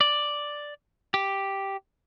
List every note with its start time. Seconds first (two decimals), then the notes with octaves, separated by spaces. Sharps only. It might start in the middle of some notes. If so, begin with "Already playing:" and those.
0.01 D5
1.14 G4